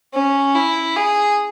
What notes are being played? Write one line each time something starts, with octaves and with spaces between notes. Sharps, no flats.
C#4
E4
G#4